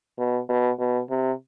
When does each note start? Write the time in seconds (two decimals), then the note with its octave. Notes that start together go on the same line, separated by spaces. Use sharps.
0.18 B2
0.49 B2
0.79 B2
1.10 C3